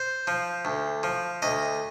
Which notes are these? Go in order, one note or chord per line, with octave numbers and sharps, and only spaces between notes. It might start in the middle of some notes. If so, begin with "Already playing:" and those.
Already playing: C5
F3
D2
F3
D2 D#5